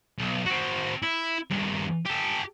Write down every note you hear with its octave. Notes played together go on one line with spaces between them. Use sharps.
B1
C4 F#4
E4
G2 D#3
G4 A4